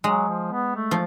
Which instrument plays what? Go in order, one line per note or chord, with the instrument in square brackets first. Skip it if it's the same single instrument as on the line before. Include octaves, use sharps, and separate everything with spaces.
[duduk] F#3 [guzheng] G#3
[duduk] F3
B3
A3
[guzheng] F3